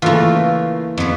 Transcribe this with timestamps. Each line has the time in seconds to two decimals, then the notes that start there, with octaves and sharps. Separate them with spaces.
0.02 C#3 E3 A3 A#3 F4
0.98 F2 B3